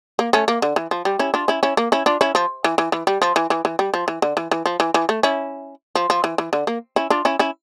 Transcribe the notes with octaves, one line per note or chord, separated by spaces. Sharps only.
A#3
A3 C#4
A#3
D3
E3
F3
G3
C#4 E4
D4 F4
C#4 E4
C#4 E4
A#3
C#4 E4
D4 F4
C#4 E4
F3
E3
E3
E3
G3
F3
E3
E3
E3
G3
F3
E3
D3
E3
E3
F3
E3
E3
A3
C#4 E4
F3
F3
E3
E3
D3
A#3
C#4 E4
D4 F4
C#4 E4
C#4 E4